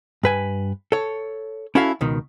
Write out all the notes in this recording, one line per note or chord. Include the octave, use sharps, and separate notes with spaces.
G2 B4 G#5
A4 C#5
C#4 E4 F#4 A4 E5 F5
C#2 B2 D#3